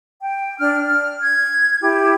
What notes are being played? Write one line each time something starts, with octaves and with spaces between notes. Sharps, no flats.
G5
D4 F6
F6
G#6
E4 G4